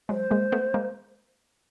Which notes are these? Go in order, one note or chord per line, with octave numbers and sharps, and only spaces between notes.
F#3 G#3 C5
G#3 A#3
A3 B3
G#3 A#3